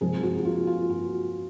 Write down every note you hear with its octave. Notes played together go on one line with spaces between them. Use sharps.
C3 F3 G#3 G#4
F#4
F#4
F4
F4
F#4